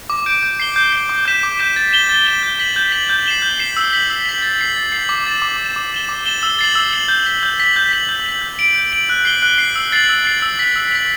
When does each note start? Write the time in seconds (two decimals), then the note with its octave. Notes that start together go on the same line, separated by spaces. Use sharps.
0.10 D6
0.26 G6 D7
0.43 G6
0.60 C7 G7
0.76 G6
0.93 C7 G7
1.09 D6
1.25 G6 B6 E7
1.43 D6
1.59 G6 B6 E7
1.76 A6
1.93 E7 G7
2.09 A6
2.26 E7 G7
2.43 G6
2.59 B6 F#7
2.76 G6
2.92 B6 F#7
3.09 G6
3.26 C7 E7 G7
3.42 G6
3.59 C7 E7 G7
3.77 E6
3.93 B6 F#7
4.10 E6
4.26 B6 F#7
4.42 A6
4.59 C7 F#7
4.76 A6
4.92 C7 F#7
5.09 D6
5.26 A6 E7
5.42 D6
5.59 A6 E7
5.76 D6
5.93 A6 E7 G7
6.09 D6
6.26 A6 E7 G7
6.43 E6
6.59 A6 C7 F#7
6.75 E6
6.93 A6 C7 F#7
7.08 G6
7.26 B6 F#7
7.43 G6
7.60 B6 F#7
7.76 G6
7.92 B6 F#7
8.09 G6
8.26 B6 F#7
8.42 G6
8.59 D7 F#7
8.75 G6
8.92 D7 F#7
9.09 F#6
9.25 C7 G7
9.42 F#6
9.58 C7 G7
9.76 E6
9.92 A6 C7 F#7
10.09 E6
10.25 A6 C7 F#7
10.42 E6
10.59 B6 F#7
10.76 E6
10.92 B6 F#7